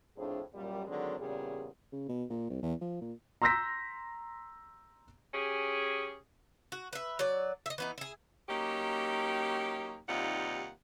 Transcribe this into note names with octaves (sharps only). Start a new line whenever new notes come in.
F2 A2 D4 G#4 C5
F#2 A#2 G3
D3 D#3 F#3 G#3 C4
E2 A#2 C#3 G3 G#4
C#3
B2
A#2
C2
E2
F3
A#2
A#5 C6 E6 G6 A#6 B6
C#4 G4 G#4
F#4
B4 E5
F#3 D5
D#5 E5
E3 B3 D#4
E4 G#4
F#3 A#3 C#4 D#4 G4
D#2 C3 G3 D#4 F4 F#5